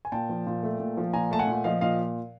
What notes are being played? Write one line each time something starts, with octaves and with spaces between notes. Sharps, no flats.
G#5
A#2 G5 A5
F3
A#2
A3
A#2
F3
A#2 G#5 A#5
A3 A5
F#5 G#5
A#2
F#5
F3 D#5 F5
A#2 D#5 F5